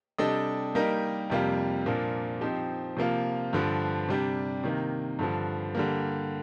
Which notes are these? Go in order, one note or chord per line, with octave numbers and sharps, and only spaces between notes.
C3 G3 D4 A4 D#5
G3 A#3 D#4 G4 A#4
F2 C3 G3 A#3 F4
A#2 F3 A#3 D4
F3 C4 D#4 G4
C3 F3 A#3 F4
G2 D3 F3
C3 G3 D4
C3 D#3 A#3
G2 D3 F3
D3 G3 A#3